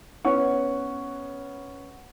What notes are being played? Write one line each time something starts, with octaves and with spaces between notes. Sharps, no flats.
B3 C#4 F#5 C#6